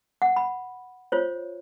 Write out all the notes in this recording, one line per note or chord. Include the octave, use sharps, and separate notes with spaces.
F#5
B5
F4 C5 C#5